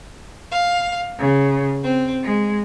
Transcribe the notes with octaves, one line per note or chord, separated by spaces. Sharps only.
F5
C#3
C4
G#3